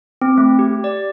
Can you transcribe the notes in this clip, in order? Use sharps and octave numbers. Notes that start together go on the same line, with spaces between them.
C4
A3
G4
D5